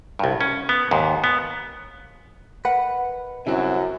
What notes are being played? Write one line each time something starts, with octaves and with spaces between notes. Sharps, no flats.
C2 G2
C#4
B3
D#2 G#2
B3
A#4 B4 D#5 F#5
F#2 C#3 G3 C4 E4 F#4